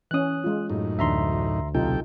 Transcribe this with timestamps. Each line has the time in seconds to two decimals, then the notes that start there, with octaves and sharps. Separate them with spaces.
0.11 E3 C#4 D#6 F#6
0.44 G#3 F4
0.70 F#2 A2 D#4
0.99 D2 E3 D4 E5 A#5 C6
1.74 B1 C3 D#4 F4 A4 G5